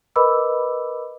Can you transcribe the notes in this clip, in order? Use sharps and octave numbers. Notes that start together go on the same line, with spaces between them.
A#4 B4 D#5 B5 D6 E6